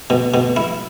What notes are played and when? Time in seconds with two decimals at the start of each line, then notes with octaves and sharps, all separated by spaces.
0.10 B2
0.34 B2
0.56 E4